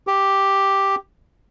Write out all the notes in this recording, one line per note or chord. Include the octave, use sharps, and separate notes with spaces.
G4